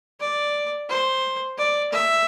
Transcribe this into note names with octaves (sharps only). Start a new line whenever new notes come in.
D5
C5
D5
E5